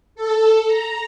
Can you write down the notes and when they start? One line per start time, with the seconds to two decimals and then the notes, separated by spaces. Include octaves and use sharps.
0.15 A4
0.67 A#5